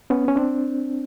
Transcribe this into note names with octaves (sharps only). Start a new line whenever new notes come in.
B3 C#4
C#4
C4 D4